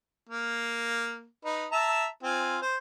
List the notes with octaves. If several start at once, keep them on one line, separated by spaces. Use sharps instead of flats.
A#3
D#4 B4
E5 A5 A#5
C4 F4 G#5
C5